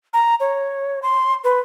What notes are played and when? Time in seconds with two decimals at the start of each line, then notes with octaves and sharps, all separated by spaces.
0.13 A#5
0.40 C#5
1.03 C6
1.44 B4